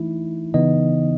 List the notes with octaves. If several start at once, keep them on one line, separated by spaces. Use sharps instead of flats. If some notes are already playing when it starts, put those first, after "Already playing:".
Already playing: E3 A3 D#4 E4
C#3 E3 B3 D#4 D#5